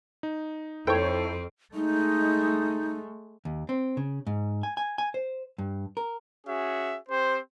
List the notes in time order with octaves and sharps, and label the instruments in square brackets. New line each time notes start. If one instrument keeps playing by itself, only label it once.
[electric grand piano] D#4
[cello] F2 C4 [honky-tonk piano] E4 A4 C5 [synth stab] C#5 G5
[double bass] G#3 A3 [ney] D#4
[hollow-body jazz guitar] D#2
C4
C#3
G#2
G#5
G#5
G#5
C5
G2
A#4
[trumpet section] C#4 F#4 G#4 E5
C4 G4 C5